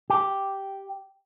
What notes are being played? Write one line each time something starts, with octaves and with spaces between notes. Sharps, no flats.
G4